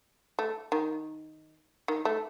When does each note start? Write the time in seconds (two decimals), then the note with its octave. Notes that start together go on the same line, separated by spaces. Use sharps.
0.39 A3
0.72 D#3
1.88 D#3
2.05 A3